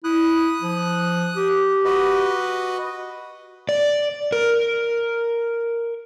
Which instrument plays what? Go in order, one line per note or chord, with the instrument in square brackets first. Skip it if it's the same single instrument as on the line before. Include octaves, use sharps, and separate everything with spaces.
[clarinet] E4 [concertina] D#6 F#6
[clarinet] F3
G4
[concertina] F#4 B4 D#5
[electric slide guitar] D5
A#4